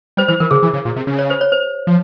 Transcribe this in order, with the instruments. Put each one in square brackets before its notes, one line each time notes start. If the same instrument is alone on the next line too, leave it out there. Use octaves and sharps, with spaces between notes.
[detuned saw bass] G3 [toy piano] C5
[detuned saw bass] E3 [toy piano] C5
[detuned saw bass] E3 [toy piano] A#4
[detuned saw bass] C#3 [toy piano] G#4
[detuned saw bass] E3
C#3
A#2
C3
C#3
[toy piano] C#5
C5
C#5
C5
[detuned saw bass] F3